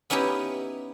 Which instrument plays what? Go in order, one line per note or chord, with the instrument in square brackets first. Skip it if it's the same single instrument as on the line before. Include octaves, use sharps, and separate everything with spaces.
[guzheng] B3 C#4 D#4 E4 G4